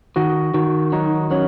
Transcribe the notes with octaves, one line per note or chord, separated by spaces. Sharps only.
D#3 F#4
D#3 F#4
F#3 D#4
F#3 C#4